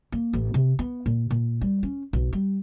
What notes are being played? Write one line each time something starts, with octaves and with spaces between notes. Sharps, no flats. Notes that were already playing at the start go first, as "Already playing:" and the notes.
A#3
A1
C3
B3
A#2
A#2
G3
C#4
B1
G3